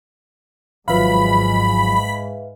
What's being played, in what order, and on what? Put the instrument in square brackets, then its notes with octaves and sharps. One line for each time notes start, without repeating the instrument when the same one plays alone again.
[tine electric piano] G#1 F3 F#3 [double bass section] G#2 [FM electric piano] B4 E5 F5 [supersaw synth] B5